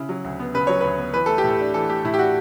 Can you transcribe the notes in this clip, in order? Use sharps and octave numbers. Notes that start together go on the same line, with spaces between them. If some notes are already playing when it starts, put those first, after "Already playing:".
Already playing: C#3 E4
F#3
D2
B3
C#3 B4
F#3 C#5
D2 B4
B3
E3 B4
A3 A4
G4
A2
A4
D4
E3 A4
A3 G4
A2 E4
G4
D4 F#4